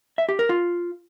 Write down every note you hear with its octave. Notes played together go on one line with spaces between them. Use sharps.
E5
G4
A#4
F4